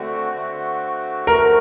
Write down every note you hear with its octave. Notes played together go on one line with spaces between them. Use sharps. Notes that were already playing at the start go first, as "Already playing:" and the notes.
Already playing: D3 A3 C4 F#4
D3 A3 C4 F#4
D3 A3 C4 F#4 A#4